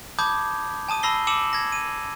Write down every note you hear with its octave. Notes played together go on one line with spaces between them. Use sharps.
A5 B5 D6 D#6 G6 G#6
G#5 A5 D#6 D#7
A5 B5 E6 A#6 C7 G7
G#5 D6 E6 C#7 E7 F#7
G#6 A#6
D#7